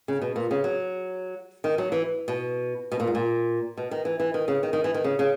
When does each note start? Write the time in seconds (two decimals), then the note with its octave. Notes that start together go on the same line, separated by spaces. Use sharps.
0.08 C#3
0.22 B2
0.36 A#2
0.51 C#3
0.64 F#3
1.64 D#3
1.78 F#3
1.92 E3
2.28 B2
2.92 B2
3.00 A#2
3.07 G#2
3.15 A#2
3.77 B2
3.91 D#3
4.05 E3
4.20 E3
4.34 D#3
4.48 C#3
4.63 D#3
4.73 D#3
4.84 E3
4.94 D#3
5.04 C#3
5.19 C#3